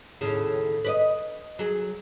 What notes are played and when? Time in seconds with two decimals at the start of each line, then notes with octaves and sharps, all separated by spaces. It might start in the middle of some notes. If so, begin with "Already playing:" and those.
0.21 D#2 A2 C#3
0.84 B4 D5 D#5
1.59 F#3 G#4